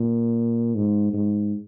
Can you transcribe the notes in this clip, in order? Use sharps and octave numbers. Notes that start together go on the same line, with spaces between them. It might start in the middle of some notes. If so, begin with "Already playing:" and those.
Already playing: A#2
G#2
G#2